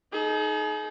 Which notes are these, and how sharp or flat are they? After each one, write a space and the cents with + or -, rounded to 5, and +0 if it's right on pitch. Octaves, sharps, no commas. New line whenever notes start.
D#4 +5 G#4 +40